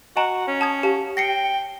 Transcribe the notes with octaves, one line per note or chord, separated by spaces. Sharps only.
F#4 D#5 G#5 A#5
C#4
A5 D#6 G#6
G4 F5 A5
G5 A#6 C7 C#7